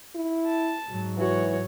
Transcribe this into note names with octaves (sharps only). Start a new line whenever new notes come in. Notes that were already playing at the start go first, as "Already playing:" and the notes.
E4
A5
G#2 F#3
E3 F#4 C#5